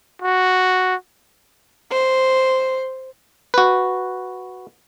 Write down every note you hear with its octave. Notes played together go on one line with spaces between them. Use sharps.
F#4
C5
F#4 B4